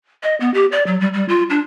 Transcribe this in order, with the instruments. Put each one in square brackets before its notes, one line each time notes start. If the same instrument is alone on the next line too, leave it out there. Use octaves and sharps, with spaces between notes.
[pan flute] D#5
B3
G4
D5
F#3
G3
G3
F4
D4